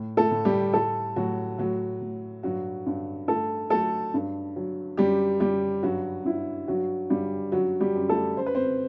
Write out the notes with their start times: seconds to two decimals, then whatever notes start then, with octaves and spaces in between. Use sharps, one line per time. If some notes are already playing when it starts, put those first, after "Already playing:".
Already playing: A2
0.17 A3 A4
0.31 A2
0.45 G3 G4
0.73 A2 A3 A4
1.16 A2 F#3 F#4
1.58 A2 F#3 F#4
2.01 A2
2.43 G2 F#3 F#4
2.86 G2
3.28 G2 A3 A4
3.70 F#3 A3 A4
4.14 G2
4.56 F#3
4.97 F#2 G3 G4
5.40 F#2 G3 G4
5.83 G2 F#3 F#4
6.25 G2 E4
6.68 G2 F#3 F#4
7.10 G2 G3 G4
7.52 F#2 F#3 F#4
7.80 G3 G4
7.95 F#2
8.09 A3 A4
8.37 F#2 C5
8.46 B4
8.55 C4 C5